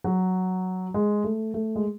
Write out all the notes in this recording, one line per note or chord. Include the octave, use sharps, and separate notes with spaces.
F#3
G#3
A3
A3
G#3